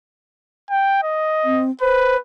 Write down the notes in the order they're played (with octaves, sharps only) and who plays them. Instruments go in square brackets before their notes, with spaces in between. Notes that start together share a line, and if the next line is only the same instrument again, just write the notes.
[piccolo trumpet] G5
D#5
[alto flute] C4
[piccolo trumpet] B4 [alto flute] C5